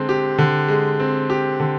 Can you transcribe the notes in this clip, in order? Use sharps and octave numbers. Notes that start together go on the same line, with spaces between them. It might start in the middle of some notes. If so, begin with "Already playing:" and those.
Already playing: D3 G#3 C4
G4
D3
G#3
C4
G4
D3